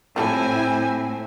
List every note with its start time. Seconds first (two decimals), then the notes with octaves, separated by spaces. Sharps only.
0.16 A2 F3 G3 C4 E4 A4 G#5